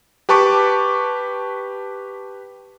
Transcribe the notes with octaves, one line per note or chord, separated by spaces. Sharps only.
G4 B4 A5 C#6 D6